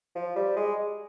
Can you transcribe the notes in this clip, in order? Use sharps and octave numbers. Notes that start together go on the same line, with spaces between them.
F3
G3
G#3